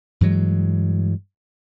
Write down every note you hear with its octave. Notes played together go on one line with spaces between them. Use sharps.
G2 E3 F#3 G#3